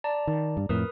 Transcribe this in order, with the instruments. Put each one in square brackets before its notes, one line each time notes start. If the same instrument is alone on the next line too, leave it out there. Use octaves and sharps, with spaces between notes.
[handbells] D5 A5 A#5
[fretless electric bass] D#3
G2
[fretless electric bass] F2 A2 [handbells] A#4 B4 D#6